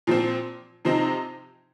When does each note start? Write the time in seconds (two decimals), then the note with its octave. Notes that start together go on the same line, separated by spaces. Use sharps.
0.07 A#2 F3 C4
0.85 C3 F3 C4 D#4